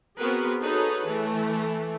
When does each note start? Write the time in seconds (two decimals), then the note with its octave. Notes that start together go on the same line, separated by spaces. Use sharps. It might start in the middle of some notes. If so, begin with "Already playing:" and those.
0.18 B3 C4 F#4 G#4 A#4 B4
0.62 D#4 F#4 G#4 A4 B4 C#5
1.07 E3 A3